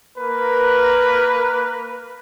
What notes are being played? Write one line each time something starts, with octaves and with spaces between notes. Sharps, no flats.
A#3 A#4 B4